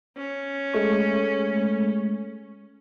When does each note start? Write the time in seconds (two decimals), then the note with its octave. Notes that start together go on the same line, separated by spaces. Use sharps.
0.17 C#4
0.74 G#3 A3 C#6